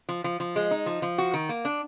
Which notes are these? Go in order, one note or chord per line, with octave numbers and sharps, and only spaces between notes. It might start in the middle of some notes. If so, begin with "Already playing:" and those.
F3
F3
F3
G#3
D#4
F3
F3
F#4
D#3
A#3
D4